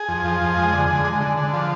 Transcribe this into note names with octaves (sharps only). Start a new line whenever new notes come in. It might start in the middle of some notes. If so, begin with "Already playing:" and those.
Already playing: G#4
F2
F3
F2
G#3
D3
D3
G#3
D3
D3
F3